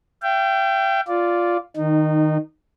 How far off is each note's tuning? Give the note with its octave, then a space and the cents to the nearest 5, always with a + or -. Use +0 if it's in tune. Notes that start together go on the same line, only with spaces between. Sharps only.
E5 +45 G5 -10
F4 +0 D5 -10
D#3 +0 D#4 -25